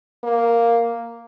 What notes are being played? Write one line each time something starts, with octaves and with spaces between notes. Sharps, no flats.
A#3